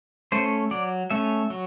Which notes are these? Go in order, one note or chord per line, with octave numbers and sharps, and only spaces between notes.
A3 C#4 C5
F#3 D5
A3 C#4 E5
F#3